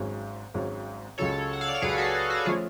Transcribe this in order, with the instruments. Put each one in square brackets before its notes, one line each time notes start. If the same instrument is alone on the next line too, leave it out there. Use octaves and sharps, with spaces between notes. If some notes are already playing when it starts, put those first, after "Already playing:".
Already playing: [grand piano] G#1 G#2 F#3 C#4
G#1 G#2 F#3 C#4
[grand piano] C#2 C#3 F#3 [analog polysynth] A4 C#5
[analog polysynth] F#5
F5
D5
C#5
[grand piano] C#2 C#3 F#3 [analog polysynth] G#4 B4
[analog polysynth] F#4 A4
F#4
F#4
[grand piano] F3 A3 C#4 [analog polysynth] F4 G#4